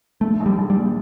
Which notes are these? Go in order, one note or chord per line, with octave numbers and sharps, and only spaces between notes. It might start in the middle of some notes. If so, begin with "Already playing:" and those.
A#1 A3
A#1
G3
A#1
G3
A#2